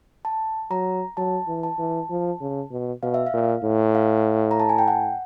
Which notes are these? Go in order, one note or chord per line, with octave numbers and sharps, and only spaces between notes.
A5
F#3 A#5
F#3 A5
E3
A5
E3
F3
C#3
B2
B2 F5
E5
F5
A#2
A2
F5
A#5
A5
G#5
G5
F#5